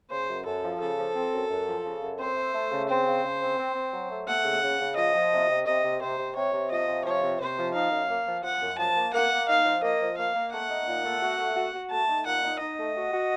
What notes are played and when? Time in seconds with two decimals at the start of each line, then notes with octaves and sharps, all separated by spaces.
0.11 C#3 C5
0.28 F#2
0.46 F#2 A4
0.63 F3
0.80 C#3 A4
0.98 F3
1.15 C4
1.33 F#2
1.50 F#2
1.67 F3
1.84 C#3
2.02 F#2
2.19 C4 C5
2.36 A3
2.54 A3
2.72 C#3
2.89 C4 C5
3.06 C#3
3.23 C#3
3.41 C4
3.58 C4
3.75 C4
3.93 F#3
4.10 A3
4.27 A3 F#5
4.45 C#3
4.63 C#3
4.80 C#3
4.96 F3 D#5
5.14 F3
5.32 C3
5.49 C3
5.66 C3 D#5
5.84 C3
6.01 C3 C5
6.18 C3
6.36 C3 C#5
6.53 C3
6.71 F3 D#5
6.87 C3
7.05 F3 C#5
7.23 C3
7.40 C3 C5
7.58 F3
7.74 D#4 F5
7.91 F#2
8.09 A#3
8.27 F3
8.43 F3 F#5
8.61 F#2
8.78 F3 A5
8.96 A#3
9.13 A#3 F#5
9.31 A#3
9.48 D#4 F5
9.65 F3
9.82 A#3 D#5
10.00 F3
10.18 A#3 F5
10.34 A#3
10.52 A3 F#5
10.70 D#4
10.87 A#2
11.04 A3
11.22 F#4
11.39 A3
11.57 F#4
11.74 F#4
11.91 A3 A5
12.09 D#4
12.25 A#2 F#5
12.43 D#4
12.60 D#4 D#5
12.78 A3
12.95 F#4
13.13 F#4